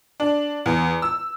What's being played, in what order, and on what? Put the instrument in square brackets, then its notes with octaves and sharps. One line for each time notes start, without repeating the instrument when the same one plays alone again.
[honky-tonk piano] D4
E2
E6